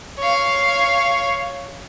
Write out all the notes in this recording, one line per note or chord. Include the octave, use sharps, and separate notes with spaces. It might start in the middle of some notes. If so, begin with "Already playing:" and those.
C#5 F5